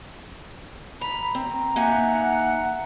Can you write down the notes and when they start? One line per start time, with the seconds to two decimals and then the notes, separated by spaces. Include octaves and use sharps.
1.01 A#5 B5
1.35 C4 A#5
1.76 A#3 D#4 E5 F#5 G#5